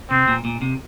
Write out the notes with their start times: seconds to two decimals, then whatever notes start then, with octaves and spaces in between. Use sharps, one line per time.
0.11 C3 C4
0.28 A#2
0.45 A#2
0.61 C3